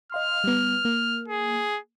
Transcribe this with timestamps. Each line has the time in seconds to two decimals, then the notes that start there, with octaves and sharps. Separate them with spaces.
0.12 D#5 F5 C6 F6
0.44 G3 B3
0.85 A#3
1.28 G#4